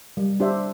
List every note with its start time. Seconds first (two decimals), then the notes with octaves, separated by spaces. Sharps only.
0.17 G3
0.40 D4 G4 C5 E5